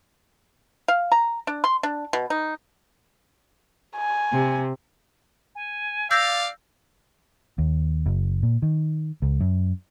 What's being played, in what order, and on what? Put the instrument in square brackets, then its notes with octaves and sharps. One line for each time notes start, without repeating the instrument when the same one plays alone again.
[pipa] F5
A#5
D4
C6
D4
B2
D#4
[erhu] G#5
[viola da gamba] C3
[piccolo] G#5
[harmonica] D5 F5 [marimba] E6 G6 A#6 [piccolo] A6
[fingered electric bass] D#2
F#1
A#2
D#3
C#2
F#2